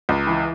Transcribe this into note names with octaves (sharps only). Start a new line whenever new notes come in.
C#2
E3